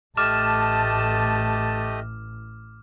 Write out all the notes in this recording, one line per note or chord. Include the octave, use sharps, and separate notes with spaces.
A1 A3 G4 D#5 A5 D6 F6 E7